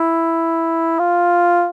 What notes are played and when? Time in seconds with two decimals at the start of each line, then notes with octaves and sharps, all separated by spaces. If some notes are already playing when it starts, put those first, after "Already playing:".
Already playing: E4
0.99 F4